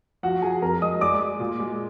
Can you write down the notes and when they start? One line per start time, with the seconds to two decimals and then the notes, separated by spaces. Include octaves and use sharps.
0.23 F3 F#4 F#5
0.42 F3 G#4 G#5
0.62 F2 A#4 A#5
0.82 G#3 D#5 D#6
1.01 G#3 D5 D6
1.20 G#3
1.40 A#2
1.60 G#3